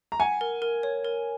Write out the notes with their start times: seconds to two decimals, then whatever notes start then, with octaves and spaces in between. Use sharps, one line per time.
0.12 A#5
0.20 F#5 G#5
0.41 A#4
0.62 A#4
0.83 C#5
1.05 A#4